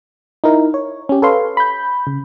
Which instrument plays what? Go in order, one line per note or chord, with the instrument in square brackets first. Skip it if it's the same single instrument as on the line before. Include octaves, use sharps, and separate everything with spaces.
[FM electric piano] D#4 E4 A#4
C#5
C#4 G4
A4 B4 C#5 F5 C6
B5 G6
C#3